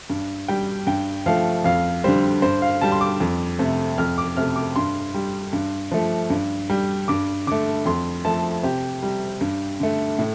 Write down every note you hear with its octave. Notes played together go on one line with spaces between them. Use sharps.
G2
G3 G5
G2 G5
F3 A3 F5
F2 F5
D3 G3 C5
G2 C5
F5
D3 G3 A5
C6
D6
F2
C3 A3
F2 F6
D6
C3 A3 F6
D6
G2 C6
G3
G2
F3 A3
G2
G3
G2 D6
D3 A3 D6
F2 C6
F3 A3 A5
C3 G4
G3
G2
D3 A3
A2